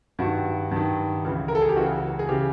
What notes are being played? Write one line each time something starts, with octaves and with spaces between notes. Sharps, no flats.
G2 D#3 F#4
G2 D#3
C#2 C#3 E3
A#4
A4
G#4
G4
C#2 C#3 E3 F#4
G#4
C#3 E3 G4